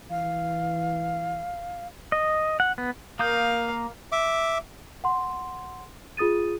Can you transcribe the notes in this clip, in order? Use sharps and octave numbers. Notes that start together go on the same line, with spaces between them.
E3 F5
D#5
F#5
B3
A#3 A#4 F5 D#6 G6
E5 D6
F#5 C6
F4 G#4 D#6 A6 D#7